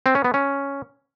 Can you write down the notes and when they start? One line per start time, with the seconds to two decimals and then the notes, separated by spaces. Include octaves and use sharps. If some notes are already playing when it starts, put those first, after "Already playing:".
0.06 C4
0.15 C#4
0.24 B3
0.34 C#4